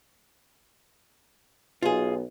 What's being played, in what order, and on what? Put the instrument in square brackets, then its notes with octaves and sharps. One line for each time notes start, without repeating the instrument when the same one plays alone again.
[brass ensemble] B1 [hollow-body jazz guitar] F4 G#4